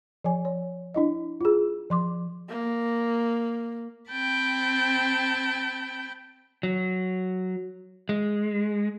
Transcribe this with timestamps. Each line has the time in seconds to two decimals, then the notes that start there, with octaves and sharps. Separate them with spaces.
0.24 F3 C#5 G#5
0.45 C#5
0.94 D4 E4 D#5
1.41 F4 G#4
1.90 F3 C6 D6
2.49 A#3
4.10 C4 G5 A5 B5
6.63 F#3
8.09 G#3